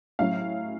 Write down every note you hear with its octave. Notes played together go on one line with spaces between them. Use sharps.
A2 F#3 C#4 F5